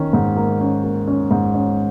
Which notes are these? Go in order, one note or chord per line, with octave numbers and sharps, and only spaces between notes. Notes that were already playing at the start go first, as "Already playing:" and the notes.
Already playing: D#3 C#4
G#2
A#3
C#4
A#3
C#4
G#2
C#4